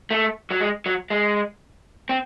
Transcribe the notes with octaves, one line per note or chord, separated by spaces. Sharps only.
A3
F#3
G#3
F#3
G#3
C4